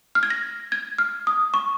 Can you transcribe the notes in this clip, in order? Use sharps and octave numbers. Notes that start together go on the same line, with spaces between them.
F6
G#6
A#6
G#6
F6
D#6
C#6